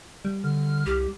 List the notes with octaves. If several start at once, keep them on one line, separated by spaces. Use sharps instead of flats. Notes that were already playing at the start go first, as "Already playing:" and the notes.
G3
D3 F6
C2 G4